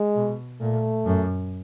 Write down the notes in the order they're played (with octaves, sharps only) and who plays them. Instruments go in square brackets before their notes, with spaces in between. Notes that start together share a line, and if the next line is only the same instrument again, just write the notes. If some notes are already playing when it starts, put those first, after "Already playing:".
Already playing: [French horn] G#3
[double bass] B2
[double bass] A#2 [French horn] A3
[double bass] F#2